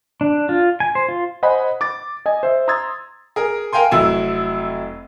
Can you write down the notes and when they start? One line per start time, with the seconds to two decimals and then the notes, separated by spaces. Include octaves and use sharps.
0.21 D4
0.49 F4
0.80 G#5
0.95 C5
1.09 F4
1.43 C5 D#5 F#5 G#5 B5
1.81 D6 A6
2.26 D#5 G#5
2.43 C5 E5
2.68 A#5 C6 D#6 E6 G#6 A6
3.36 G#4 A#4
3.73 A#4 F5 G5 G#5 C6
3.91 F1 F#3 E4 E6